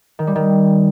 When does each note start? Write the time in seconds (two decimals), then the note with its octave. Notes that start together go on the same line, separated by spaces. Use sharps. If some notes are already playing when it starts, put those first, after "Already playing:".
0.19 D#3
0.27 G3
0.36 D#3